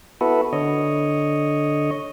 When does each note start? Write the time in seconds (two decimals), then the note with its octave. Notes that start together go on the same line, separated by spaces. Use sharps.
0.21 B3 E4 F#4 A4 B4
0.53 D3 C#5 D#5